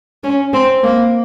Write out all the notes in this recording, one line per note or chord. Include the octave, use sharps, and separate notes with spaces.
C#4
C4
A#3